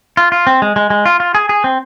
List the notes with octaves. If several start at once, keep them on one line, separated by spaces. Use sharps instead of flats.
F4
F4
C4
G#3
G#3
G#3
F4
F4
G#4
G#4
C4